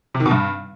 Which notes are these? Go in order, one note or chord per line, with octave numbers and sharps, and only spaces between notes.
C3
D#3
B2
G2